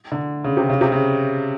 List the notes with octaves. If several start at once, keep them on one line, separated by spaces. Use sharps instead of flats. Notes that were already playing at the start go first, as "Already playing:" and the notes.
D3
C#3
C3
C#3
C3
C#3